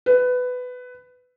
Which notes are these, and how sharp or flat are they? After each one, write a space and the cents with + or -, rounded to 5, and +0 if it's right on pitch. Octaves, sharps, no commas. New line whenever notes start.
B4 +15